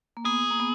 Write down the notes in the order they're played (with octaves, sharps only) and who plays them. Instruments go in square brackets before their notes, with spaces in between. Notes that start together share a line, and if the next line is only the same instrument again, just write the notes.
[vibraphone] A#3
[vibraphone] B3 [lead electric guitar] G#4
[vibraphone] A#3
B3